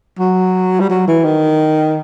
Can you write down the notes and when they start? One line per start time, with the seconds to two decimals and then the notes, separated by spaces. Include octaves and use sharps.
0.19 F#3
0.80 G3
0.90 F#3
1.07 E3
1.24 D#3